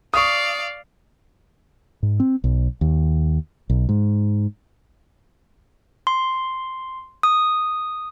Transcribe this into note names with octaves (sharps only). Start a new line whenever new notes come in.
D5 F5 C#6 D#6
G#2
C4
B1
D#2
B1
G#2
C6
D#6